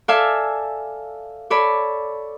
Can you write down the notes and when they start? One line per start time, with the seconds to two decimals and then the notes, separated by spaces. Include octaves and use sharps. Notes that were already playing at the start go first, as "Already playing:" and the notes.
0.08 A4 D5 E5 F5 G#5
1.50 A4 C#5 D5 B5